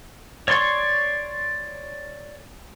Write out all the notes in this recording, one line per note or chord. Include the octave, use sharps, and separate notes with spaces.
C#5 D5 C6 C#6